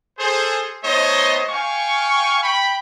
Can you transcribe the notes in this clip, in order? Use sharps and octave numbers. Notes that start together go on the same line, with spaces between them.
G#4 A4 C5
A3 B3 D#4 C5 C#5 D#5
F5 G5 G#5 C#6
G5 B5